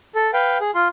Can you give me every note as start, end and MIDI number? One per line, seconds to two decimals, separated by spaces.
0.15 0.31 69
0.34 0.58 71
0.34 0.58 77
0.34 0.58 79
0.61 0.71 68
0.75 0.88 65
0.75 0.88 84